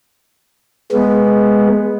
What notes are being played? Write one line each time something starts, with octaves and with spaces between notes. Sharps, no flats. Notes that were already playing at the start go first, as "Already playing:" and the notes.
G#3 B3